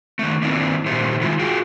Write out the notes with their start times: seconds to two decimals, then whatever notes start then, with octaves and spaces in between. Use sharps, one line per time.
0.19 D#3 A3
0.42 D#3 A#3 C4 D4 E4
0.86 A#2 D#3 G3 A3 C5
1.21 D#3 G#3 E4 F4
1.39 F4 F#4 G#4 G5